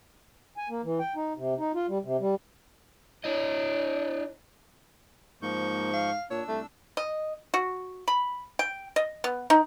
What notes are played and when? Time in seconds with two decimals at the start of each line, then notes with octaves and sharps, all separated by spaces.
0.57 G#5
0.70 A#3
0.84 E3
1.00 G5
1.16 D#4
1.36 C3
1.58 D#4
1.75 F4
1.89 G3
2.04 C3
2.20 G3
3.24 D4 E4 C#5 D#5
5.42 G#2 F3 A#3 C#6 G6
5.93 F5
6.31 A#2 D4 C#5 E6
6.48 C2 A3
6.97 D#5
7.54 F#4
8.08 B5
8.59 G5
8.96 D#5
9.24 B3
9.50 D#4